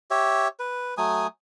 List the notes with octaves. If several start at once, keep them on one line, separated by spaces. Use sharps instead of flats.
G4 C#5 E5
B4
F#3 A3 G#5 D#6